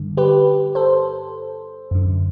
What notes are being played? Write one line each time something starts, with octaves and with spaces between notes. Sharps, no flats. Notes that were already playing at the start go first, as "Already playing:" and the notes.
Already playing: G2 D3
G4 B4
A4 C5
F#2 D3